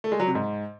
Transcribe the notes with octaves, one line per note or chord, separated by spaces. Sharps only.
A3
G#3
F#3
C3
G#2